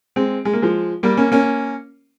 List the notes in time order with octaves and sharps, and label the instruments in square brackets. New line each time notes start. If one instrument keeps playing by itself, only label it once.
[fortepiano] G#3 C4
G#3
A#3
F3 G#3
G3 A#3
A#3 C#4
A#3 C#4